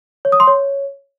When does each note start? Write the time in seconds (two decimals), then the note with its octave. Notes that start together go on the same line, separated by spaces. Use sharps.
0.25 C#5
0.32 D#6
0.40 C6
0.47 C#5